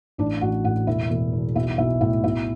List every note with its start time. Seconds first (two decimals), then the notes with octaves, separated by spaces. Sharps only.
0.18 A1 D4 D5
0.41 A1 F#4 F#5
0.64 A2 F#4 F#5
0.87 E1 E4 E5
1.10 E1
1.32 E2
1.55 B1 E4 E5
1.78 B1 E4 E5
2.01 A2 E4 E5
2.24 B1 E4 E5